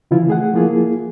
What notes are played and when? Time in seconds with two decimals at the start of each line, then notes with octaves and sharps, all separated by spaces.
0.11 C#3 E3 F3 E4 F4
0.28 A3 G#4 F#5
0.54 F3 A#3 E4 F4 G#4